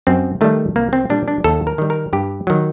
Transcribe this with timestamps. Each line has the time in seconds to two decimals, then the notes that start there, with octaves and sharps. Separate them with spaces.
0.07 F#2 C4
0.41 D#3 G3 A3
0.76 C2 A#3
0.93 C4
1.10 A#2 G3 D4
1.28 D4
1.44 D#2 A4
1.67 A#4
1.78 D#3 G3
1.90 A#4
2.13 G2 G4
2.47 D#3 F#3